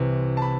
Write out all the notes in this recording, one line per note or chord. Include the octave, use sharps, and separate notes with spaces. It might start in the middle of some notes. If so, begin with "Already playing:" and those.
Already playing: C2 C3 E3
A5
B5